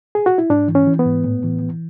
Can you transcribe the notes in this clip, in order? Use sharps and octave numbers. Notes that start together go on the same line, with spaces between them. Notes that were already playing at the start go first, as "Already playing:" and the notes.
G#4
F#4
E4
G#2 D4
E3
C#4
E3
B3
G#2
A2
E3
E3